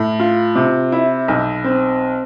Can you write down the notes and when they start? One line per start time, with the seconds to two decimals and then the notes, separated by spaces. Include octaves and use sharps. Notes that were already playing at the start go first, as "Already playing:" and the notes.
Already playing: A2
0.19 F4
0.56 C3
0.92 E4
1.28 B1
1.64 C4